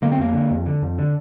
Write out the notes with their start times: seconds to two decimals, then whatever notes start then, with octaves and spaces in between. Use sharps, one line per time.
0.02 D3 A#3
0.12 C4
0.19 F2 A#3
0.34 D3
0.51 F2
0.66 D3
0.82 F2
0.98 D3